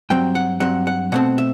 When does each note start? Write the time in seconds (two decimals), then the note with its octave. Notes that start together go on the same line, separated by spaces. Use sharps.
0.10 G2 F#3 C4 G5
0.35 F#5
0.60 G2 F#3 C4 F#5
0.87 F#5
1.12 B2 A3 C4 F#5
1.38 E5